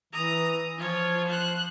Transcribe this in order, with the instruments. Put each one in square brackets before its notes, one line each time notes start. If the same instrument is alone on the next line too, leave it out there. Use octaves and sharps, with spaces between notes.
[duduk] E3 [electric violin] A#5 D#6
[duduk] F3 [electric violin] F4 C#5
[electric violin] C5 F#6